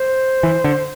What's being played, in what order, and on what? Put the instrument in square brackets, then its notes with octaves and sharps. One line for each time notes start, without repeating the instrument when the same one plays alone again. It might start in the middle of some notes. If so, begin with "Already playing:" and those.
Already playing: [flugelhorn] C5
[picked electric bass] E3
D3